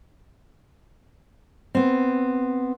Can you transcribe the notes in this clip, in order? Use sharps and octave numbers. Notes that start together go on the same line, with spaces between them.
B3 C4